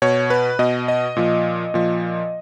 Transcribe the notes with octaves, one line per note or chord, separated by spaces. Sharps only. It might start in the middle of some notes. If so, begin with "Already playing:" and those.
B2 C#5
B4
B2 D#5
D#5
A#2 F3
A#2 F3